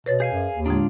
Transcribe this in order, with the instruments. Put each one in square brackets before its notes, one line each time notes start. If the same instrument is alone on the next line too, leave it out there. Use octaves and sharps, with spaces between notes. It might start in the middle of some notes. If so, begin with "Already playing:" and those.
[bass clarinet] B2 [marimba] B4 C#5 A6
[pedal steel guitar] G#4 F5 G#5 [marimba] G6
[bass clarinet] F#2
D#2
[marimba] A2 D3 G#3 [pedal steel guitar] D4 F4